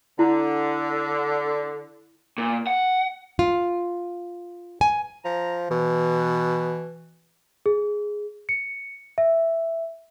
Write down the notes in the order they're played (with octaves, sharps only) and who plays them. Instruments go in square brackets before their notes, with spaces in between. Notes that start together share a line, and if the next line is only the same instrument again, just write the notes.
[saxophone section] D3 [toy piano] E4
[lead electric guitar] A#2
F#5
[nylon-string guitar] F4
G#5
[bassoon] F3 [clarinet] A#5
[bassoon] B2 [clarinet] E3
[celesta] G#4
C#7
E5